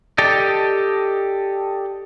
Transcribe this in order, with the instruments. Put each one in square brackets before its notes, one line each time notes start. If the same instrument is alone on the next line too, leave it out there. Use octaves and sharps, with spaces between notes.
[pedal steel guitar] G4 A4 D5 D#5